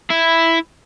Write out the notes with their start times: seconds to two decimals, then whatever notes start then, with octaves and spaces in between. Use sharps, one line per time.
0.11 E4